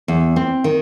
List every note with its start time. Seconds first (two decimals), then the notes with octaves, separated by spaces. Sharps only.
0.08 E2
0.36 C4
0.64 D#3